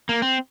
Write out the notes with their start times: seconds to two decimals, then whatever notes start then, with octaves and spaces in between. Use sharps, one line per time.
0.09 A#3
0.22 C4